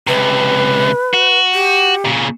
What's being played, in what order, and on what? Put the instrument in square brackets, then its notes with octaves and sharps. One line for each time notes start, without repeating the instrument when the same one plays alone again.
[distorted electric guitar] C#2 C3 [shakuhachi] B4
[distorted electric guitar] F#4
[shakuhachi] G4
[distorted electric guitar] A#2 C#3